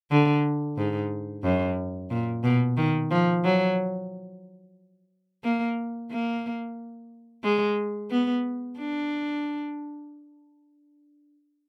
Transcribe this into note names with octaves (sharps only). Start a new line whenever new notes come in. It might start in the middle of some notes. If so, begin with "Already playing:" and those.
D3
G#2
F#2
A#2
B2
D#3
F3
F#3
A#3
A#3
G#3
B3
D4